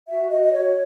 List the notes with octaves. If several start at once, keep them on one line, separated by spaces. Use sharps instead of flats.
F#4 E5
F#4 D#5
D#5
F#4 C#5